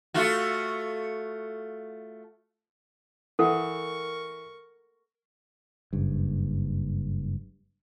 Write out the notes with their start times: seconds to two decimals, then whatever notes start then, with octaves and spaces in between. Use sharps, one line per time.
0.14 A3 F4 F#4
3.39 E3 A4 A#4 F#5 C#6
5.93 F#1 G2